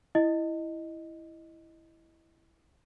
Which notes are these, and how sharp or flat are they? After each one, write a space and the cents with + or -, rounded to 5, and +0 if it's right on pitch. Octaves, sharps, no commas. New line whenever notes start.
E4 +0 D#5 +0